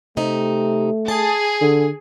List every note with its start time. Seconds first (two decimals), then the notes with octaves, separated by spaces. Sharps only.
0.17 C3 A3 D#4
1.08 G#4 A5
1.61 D3